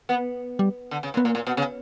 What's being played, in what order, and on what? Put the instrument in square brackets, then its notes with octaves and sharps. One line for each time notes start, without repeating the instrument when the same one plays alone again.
[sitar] B3
[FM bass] G3
[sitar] D3
C#3
A#2
[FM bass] B3
[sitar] A#2 [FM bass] A#3
[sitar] A#2
B2
C#3